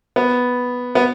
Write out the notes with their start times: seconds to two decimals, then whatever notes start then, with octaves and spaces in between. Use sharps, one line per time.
0.16 B3
0.95 B3